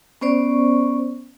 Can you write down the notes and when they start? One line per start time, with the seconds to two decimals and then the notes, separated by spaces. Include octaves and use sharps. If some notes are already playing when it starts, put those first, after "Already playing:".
0.21 B3 C#4 C5 D5 C#6